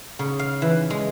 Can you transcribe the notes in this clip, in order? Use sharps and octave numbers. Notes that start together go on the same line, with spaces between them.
C#3
F5
E3
G#3